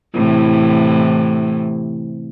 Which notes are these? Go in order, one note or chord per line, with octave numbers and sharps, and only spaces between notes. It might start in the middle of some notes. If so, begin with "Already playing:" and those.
A2 C3 E3